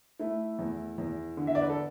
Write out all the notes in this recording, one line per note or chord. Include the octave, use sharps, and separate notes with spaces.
A3 E4
E2
E2
D3
E5
D5
B4
A4